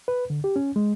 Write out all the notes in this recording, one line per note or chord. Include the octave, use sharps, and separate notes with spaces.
B4
D3
G4
C#4
G#3